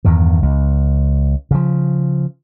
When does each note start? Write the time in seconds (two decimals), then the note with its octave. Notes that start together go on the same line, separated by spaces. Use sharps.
0.05 E2 G2 D#3
0.42 C#2
1.51 C#3 F3